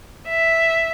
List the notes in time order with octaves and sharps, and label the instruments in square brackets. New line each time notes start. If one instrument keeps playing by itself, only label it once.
[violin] E5